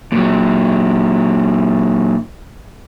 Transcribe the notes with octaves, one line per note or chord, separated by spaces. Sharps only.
A#2 F#3